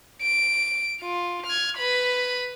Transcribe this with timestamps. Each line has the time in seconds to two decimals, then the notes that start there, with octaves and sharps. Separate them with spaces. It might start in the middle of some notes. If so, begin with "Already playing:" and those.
0.22 D7
1.01 F4
1.46 F6 G#6
1.77 B4 B5